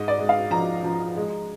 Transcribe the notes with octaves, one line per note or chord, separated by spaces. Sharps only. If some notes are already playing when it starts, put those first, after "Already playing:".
Already playing: G#2 D#5
D5
G#3
F5
F3 A#5
F3
G#3